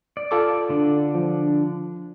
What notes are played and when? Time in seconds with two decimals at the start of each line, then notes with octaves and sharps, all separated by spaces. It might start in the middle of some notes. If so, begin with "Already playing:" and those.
0.17 D5
0.31 F4 A4 D6
0.69 D3 D4
1.15 F3